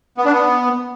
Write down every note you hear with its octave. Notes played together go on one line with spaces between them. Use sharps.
B3
D4
B3